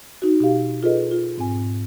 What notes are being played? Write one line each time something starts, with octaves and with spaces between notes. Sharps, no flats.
D#4 F#4
B2 G4 F5
F4 G#4 A4 B4 D#5
F4
G#2 C4 G#5
G#2